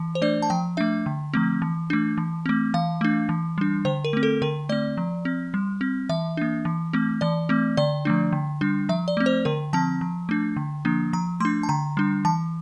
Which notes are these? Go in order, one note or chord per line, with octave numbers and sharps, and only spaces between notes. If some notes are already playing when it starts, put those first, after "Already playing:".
Already playing: E3
C5
A3 D4 D5
A5
F3 G5
A3 D4 E5
D3
F3 A3 C4
E3
A3 D4
E3
A3 C4
E3 F5
A3 D4
E3
G3 D4
D3 C5
A#4
A3 C4
A4
D3 A#4
A3 C4 D5
F3
C4
G3
C4
E3 E5
A#3 D4
E3
A3 C4
E3 D5
A3 C4
D3 D5
F3 A3 D4
D3
G3 D4
F3 E5
D5
A3 C4
C5
D3 A#4
F3 C4 A5
F3
A3 D4
D3
F3 A#3 D4
F3 A#5
A3 D4 C6
A5
D3 A#5
G3 D4
E3 A5